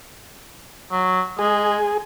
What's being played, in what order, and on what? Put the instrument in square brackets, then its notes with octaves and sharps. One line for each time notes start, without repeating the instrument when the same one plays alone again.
[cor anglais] F#3
[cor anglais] G#3 [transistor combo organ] G#4